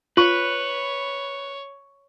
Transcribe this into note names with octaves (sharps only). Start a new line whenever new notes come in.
F4 B4 C#5 C#6